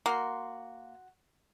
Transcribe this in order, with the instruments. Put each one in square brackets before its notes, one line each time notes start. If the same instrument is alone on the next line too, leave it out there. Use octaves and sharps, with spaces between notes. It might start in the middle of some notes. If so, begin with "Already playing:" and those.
[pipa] A#3 [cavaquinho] F#4 C6